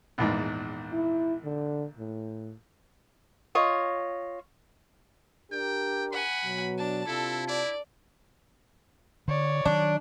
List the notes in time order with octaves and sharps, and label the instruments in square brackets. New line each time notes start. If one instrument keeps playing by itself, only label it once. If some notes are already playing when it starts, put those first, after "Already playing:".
[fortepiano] A#1 E2 G#2
[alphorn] E4
D3
A2
[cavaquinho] F4 C#5 D#5
[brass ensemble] D4 G4 A#4 [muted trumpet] G5
[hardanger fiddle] F#5 G#5 [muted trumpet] B5
[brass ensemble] B2 F#3
[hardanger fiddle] D4 A5
[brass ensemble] C3 F4 A5 [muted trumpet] E4 [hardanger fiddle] A4
[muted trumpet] E4 [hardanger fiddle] D5
[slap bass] D3 [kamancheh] C#5 D5
[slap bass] D#3 F#3 [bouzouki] D4